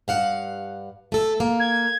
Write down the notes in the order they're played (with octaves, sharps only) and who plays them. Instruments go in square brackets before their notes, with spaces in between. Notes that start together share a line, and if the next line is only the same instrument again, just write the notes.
[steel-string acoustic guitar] G2 F5 F#5
A3 A4
A#3
[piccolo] G#6